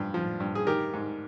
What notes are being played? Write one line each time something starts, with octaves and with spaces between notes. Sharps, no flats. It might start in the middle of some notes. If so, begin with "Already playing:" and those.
Already playing: G2 F3
F3
G2
G#4
D#3 G4 A#4
G#2